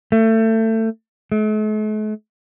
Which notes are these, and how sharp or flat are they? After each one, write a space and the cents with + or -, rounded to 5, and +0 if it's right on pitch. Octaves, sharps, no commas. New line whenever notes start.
A3 +25
A3 -45